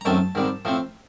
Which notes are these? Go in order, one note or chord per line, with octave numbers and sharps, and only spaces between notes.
A#5
F#2 D#3 F#3 A3 C4 A5
G#2 D#3 G3 C4
A2 F3 A3 C4